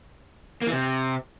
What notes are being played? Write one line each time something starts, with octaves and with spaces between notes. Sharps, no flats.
A#3
E3
C3